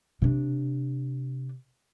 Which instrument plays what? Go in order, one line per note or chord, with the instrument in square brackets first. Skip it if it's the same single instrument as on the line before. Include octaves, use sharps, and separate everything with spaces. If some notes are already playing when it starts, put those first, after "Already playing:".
[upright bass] C3 D4